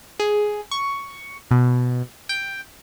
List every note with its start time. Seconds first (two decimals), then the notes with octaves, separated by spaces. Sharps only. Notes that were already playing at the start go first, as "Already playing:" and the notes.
0.20 G#4
0.71 C#6
1.51 B2
2.29 G5